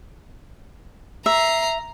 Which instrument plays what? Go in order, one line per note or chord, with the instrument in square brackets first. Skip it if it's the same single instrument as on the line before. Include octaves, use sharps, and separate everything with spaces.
[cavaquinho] E5 [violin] A#5 C7